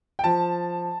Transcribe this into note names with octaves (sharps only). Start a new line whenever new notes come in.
G5
F3 A5